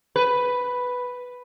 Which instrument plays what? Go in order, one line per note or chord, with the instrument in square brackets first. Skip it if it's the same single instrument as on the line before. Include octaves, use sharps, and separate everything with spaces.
[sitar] B4